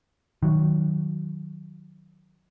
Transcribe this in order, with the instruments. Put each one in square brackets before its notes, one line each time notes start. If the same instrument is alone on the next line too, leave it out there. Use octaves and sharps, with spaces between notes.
[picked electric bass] D#3 F#3